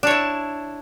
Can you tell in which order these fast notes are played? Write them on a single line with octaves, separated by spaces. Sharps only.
D4 C#5 E4